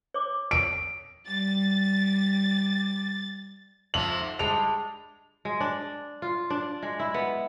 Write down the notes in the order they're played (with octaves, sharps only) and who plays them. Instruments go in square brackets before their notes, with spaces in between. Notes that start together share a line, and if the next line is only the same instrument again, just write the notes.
[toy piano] C#5 D6
[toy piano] E6 [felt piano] D7
[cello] G3 [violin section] A6
[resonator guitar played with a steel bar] F2 [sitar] C3 F3 [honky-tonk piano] F#7
[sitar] G#2
[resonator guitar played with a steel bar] G3 G#3 [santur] D4 [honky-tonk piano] F7
[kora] G#3
D4
F4
D4
G#3
E4
B3